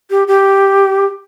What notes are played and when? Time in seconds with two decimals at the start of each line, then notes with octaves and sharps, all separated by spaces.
0.10 G4
0.28 G4